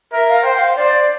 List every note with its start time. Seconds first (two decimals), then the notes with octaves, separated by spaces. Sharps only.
0.12 A#4 E5
0.28 F5
0.44 C5 G5
0.55 G5
0.59 F5
0.76 C5 D5